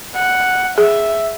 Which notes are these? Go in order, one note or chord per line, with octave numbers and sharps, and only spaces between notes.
F#5
G#4 E5